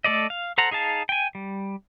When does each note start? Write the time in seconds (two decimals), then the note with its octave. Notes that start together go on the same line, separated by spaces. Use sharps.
0.04 A3 A4 D5 D#5
0.30 F5
0.58 A4 C5 F#5 A#5
0.71 D#4 G#4 F5 A5
1.09 G5 G#5
1.35 G3